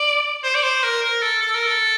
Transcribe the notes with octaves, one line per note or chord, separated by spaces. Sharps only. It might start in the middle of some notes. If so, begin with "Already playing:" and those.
Already playing: D5
C5
D5
C5
A#4
A#4
A4
A4
A#4
A4